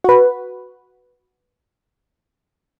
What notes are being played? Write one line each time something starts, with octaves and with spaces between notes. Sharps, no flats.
F#4 B4